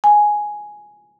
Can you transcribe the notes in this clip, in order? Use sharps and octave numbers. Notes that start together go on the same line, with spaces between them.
G#5